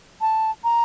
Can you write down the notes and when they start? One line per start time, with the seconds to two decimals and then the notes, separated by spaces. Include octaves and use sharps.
0.21 A5
0.64 A#5